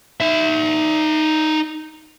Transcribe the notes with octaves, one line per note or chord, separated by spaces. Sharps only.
D#4 E5